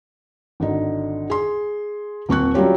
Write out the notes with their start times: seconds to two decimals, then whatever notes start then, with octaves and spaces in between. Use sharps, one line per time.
0.60 G#1 D3 D#4
1.30 G#4 C6
2.29 D#1 C4 C#6 F#6
2.54 F#3 G3 C#4 F4 G4 C#5